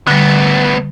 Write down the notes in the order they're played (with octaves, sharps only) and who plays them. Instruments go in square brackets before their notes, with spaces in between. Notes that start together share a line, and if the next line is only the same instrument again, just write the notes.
[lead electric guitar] D2 B3 [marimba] D3 G3